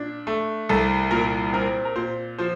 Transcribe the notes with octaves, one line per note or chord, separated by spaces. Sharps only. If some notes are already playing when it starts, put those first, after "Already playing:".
Already playing: A#2 D4
A3
C2 A4
A#2 A#4
C4 A#4
A#4
A#2 C5
F3 C5